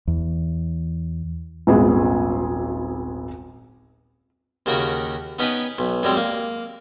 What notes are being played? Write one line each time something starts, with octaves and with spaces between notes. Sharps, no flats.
E2
D#1 G#1 B3 G#4
D#2 C#3 F#4 A#4 G5 C#6
B3 C#4 D#4 B4 G5 G#5
B1
F#2 G3 G#3 C4
A#3